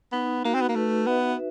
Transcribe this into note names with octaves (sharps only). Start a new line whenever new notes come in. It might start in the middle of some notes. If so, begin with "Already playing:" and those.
B3 D#4
A#3 F#4
C4
B3
A#3
A3 B4
B3 E5